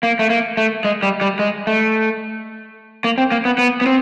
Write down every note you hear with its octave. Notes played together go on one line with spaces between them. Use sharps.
A#3
A3
A#3
A3
G#3
G3
G3
G#3
A3
A#3
C4
A#3
B3
B3
B3
C4